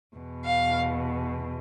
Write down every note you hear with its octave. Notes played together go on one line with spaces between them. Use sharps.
E2 B2
F5